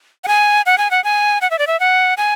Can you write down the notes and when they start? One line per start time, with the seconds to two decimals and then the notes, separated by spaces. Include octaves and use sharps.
0.24 F#5
0.28 G#5
0.66 F#5
0.78 G#5
0.91 F#5
1.04 G#5
1.41 F#5
1.51 E5
1.59 D5
1.67 E5
1.80 F#5
2.17 G#5